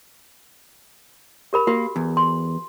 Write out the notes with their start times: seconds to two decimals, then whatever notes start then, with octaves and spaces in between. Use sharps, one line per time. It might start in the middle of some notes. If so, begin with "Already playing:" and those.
1.53 G4 A#4 B5
1.67 A#3 F#4
1.96 E2
2.17 C6